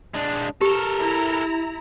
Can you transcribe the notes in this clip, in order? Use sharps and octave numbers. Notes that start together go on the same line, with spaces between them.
G#3 D4
G4 A4 A#4
E4 A#5